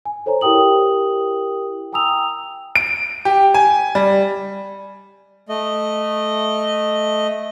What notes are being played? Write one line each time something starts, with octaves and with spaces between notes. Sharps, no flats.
G#5
A4 C5 C#5 G#5 A#5
E4 G4 A#4 G5 D#6 F#7
G5 G#5 A#5 D#6 E6 F7
D7
G4
G#5
G3
A3 D#5